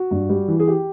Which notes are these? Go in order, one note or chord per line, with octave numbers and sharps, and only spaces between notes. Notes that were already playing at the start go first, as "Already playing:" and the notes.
Already playing: F#4
G2
G3
E3
G#4
G4